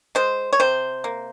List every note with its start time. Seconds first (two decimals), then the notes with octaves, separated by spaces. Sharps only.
0.15 G#3 C5
0.53 C#5
0.60 C3 C5
1.04 A#3